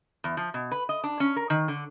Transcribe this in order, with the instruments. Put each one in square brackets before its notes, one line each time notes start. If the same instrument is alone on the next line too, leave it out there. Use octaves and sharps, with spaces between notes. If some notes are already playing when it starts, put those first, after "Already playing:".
[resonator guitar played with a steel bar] E2
F3
B2
B4
D#5
D4
C#4
A#4
D#3
D3